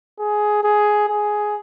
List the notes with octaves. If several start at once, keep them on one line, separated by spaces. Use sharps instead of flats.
G#4
G#4
G#4